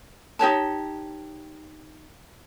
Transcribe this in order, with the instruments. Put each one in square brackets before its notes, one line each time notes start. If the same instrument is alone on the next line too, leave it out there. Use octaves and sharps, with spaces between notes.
[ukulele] D#4 G4 C#5 A5